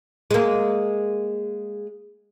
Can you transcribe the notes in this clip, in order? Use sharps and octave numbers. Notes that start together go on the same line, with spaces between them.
G#3 A#3